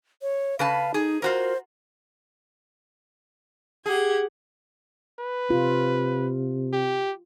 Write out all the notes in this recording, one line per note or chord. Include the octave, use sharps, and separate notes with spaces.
C#5
C#3 B4 F5 A5
D#4 G#4
F4 F#4 A#4 C5
G4 G#4 F#5 G#6
B4
C3 F4
G4